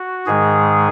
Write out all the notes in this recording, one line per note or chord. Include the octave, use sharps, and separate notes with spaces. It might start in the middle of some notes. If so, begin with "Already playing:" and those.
Already playing: F#4
G#2 D#3 G#3 G#4